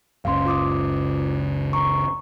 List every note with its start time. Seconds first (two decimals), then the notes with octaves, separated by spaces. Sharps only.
0.25 F#1 C#2 C#3 F5 C6
0.46 F4 D6 D#6
1.73 A#5 C#6